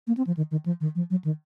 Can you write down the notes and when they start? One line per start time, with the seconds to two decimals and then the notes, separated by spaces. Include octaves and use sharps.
0.07 A#3
0.17 C4
0.27 F3
0.37 D#3
0.51 D#3
0.66 F3
0.80 D#3
0.95 F3
1.10 F#3
1.24 D#3